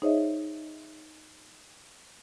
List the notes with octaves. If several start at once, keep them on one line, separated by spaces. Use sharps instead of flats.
D#4 G#4 C5 C#5 D#5 E5